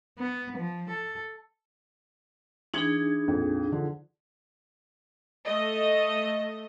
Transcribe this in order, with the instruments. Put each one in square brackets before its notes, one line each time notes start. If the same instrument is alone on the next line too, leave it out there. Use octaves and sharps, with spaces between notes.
[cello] B3
F3
A4
[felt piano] E3 G#6 C#7 [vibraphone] D4 D#4 G#4
[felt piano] A#1 F2
D3 F3
[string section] A3 D#5